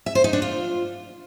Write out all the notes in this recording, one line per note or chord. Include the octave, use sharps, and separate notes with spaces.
E5
C5
D#4
D4
F4